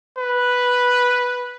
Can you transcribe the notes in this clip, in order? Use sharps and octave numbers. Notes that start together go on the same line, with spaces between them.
B4